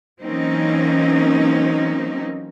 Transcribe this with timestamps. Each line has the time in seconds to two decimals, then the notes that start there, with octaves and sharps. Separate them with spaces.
0.22 E3 F#3 A#3 C4 C#4 D#4